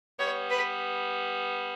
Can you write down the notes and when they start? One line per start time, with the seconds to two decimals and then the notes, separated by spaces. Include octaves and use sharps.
0.19 G3 B3 C#5
0.50 B4